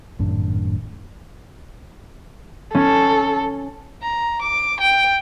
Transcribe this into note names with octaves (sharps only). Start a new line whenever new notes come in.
G#1 F#2 A2 D4
C#4 A4
A#5
D6
G5